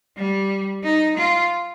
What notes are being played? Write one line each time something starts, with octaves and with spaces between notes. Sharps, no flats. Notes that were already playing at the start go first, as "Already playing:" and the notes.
G3
D#4
F4